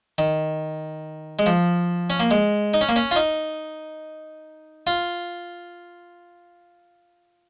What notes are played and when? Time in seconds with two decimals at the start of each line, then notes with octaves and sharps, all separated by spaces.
0.18 D#3
1.39 G#3
1.46 F3
2.10 C#4
2.20 A#3
2.31 G#3
2.74 D#4
2.81 C#4
2.89 A#3
2.96 C#4
3.11 F4
3.16 D#4
4.87 F4